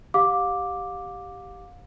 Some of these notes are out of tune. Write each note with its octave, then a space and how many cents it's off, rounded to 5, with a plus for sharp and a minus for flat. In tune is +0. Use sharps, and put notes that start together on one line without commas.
G4 +0 F5 +35 D6 +0